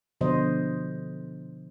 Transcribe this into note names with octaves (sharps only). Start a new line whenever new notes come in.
B2 D3 F3 C5 D#5